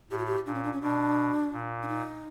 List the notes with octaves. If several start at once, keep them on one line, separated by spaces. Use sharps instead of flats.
A2 G4
F#4
G4
A#2 D4
C#4
D4
C#4
B2 D4
A#2
D4
D#4